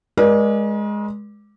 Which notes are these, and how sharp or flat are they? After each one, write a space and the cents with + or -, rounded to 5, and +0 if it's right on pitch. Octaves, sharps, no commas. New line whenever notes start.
G#3 +5 A#4 +45 D5 +0